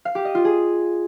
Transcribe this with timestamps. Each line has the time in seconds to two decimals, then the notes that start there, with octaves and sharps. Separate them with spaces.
0.05 F5
0.15 G4
0.25 D#5
0.35 F4
0.45 G#4